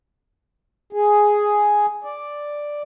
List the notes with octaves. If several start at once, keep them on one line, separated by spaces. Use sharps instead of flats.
G#4
D5